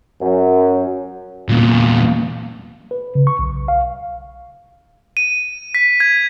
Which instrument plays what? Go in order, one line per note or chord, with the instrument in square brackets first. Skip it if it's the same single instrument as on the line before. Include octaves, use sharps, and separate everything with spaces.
[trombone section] F#2
[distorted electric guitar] E2 A#2
[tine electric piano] B4
C#3
C#6
B1
F5
[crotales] D#7
B6
G#6